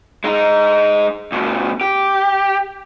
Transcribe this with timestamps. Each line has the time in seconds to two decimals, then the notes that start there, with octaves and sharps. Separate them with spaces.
0.24 G#3 D#4
1.32 D2 B2
1.81 G4